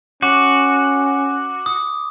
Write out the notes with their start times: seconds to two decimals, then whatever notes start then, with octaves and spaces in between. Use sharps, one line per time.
0.22 C#4 F#4 D6
1.66 D#6